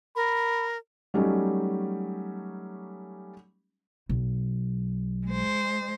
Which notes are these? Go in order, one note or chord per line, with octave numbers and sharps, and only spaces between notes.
A#4 B5
F#3 G3 A3 C#4 D#4 G4
B1
G#3 C5